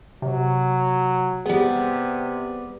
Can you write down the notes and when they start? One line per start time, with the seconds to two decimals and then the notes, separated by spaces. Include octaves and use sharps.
0.22 C3 F#3
1.46 C3 G3 B3 G#4